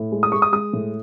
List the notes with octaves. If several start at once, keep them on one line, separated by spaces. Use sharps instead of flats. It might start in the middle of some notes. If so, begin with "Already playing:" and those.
Already playing: A2
G#3
D#6
G#3 C#6
D#6
G#3 D#6
A2